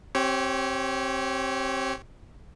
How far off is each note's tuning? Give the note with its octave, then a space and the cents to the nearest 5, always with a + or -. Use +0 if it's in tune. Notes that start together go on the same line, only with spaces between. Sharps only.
C4 +25 G4 -25 C#5 +0